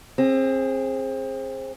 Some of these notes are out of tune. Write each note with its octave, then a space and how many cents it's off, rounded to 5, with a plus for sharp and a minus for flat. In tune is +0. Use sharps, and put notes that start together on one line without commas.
C4 +25 G#4 -5